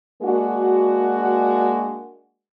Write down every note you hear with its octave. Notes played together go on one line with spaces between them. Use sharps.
G#3 A#3 D4 F#4